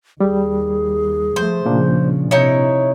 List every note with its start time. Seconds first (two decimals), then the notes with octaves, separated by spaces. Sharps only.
0.20 D#2 G3 G#4
1.36 F3 A3 C5
1.65 A#2 C#3 F3 A#3 D4
2.31 C3 D#4 E4 C#5